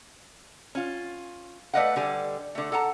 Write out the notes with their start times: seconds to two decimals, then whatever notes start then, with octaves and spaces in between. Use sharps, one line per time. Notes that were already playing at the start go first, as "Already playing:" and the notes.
0.75 C#4 F4
1.73 A3 B4 D5 D#5 F5 F#5
1.96 D3 G3 G#5
2.55 D3 A3
2.72 A4 F#5 A5 A#5